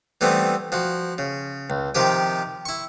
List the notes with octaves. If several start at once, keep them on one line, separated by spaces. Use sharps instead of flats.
E3 G3 A3 B3 C4
F3 F#4
C#3
C#2
C3 D#3 F3 G4 G5
E4 C#6